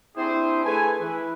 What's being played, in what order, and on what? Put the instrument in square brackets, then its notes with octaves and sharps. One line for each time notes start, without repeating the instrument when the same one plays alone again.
[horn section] C4 D4 E4 G4 G#4 C5
A3 G#4 B4 G#5
E3 E4 B4